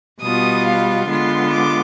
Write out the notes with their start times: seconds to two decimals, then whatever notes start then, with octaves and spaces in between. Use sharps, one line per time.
0.21 B2 G3 B3 F4 D#6
0.65 F5
1.08 D3 G#3 B3 F4 C6
1.53 D6